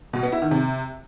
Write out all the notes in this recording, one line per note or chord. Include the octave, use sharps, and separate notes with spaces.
B2
B3
E4
D#3
C3